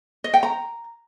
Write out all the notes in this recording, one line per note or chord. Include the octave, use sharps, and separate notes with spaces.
D#5
G5
A#5